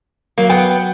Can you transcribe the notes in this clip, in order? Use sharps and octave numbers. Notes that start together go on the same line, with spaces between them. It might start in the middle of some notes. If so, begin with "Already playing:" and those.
F#3 A#3
B3 G5